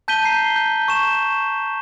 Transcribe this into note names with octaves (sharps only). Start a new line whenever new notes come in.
A5 G6 B6 D#7 G7
A#5 C7
G6
C#6 E7